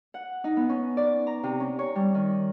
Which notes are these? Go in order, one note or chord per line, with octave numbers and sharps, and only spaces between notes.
F#5
D#4
B3
C#4
D5
A#5
C3
C#4
C#5
G3
D#3